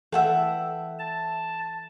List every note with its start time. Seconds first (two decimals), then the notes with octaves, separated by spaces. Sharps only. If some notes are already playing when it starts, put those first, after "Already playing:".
0.12 E3 A4 E5 F#5 G5
0.99 A5